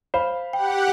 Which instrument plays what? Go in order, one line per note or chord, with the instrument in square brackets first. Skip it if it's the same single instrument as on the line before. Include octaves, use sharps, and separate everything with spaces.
[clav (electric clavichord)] C5 [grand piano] F5 B5
[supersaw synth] G4 F#5 [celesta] G5